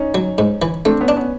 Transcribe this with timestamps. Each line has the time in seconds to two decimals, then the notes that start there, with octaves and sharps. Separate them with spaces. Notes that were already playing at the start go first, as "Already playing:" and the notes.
Already playing: C#4 D#4
0.15 F#3
0.38 G#2
0.62 E3
0.85 A3 C4 D4
1.01 B3 C#4
1.08 D4
1.16 B3 C#4